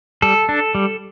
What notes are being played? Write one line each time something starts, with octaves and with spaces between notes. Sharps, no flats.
G3 A4
D4
G3